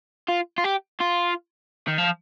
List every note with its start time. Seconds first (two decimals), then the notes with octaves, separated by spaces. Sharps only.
0.28 F4
0.58 F4
0.64 G4
1.01 F4
1.88 D#3
1.98 F3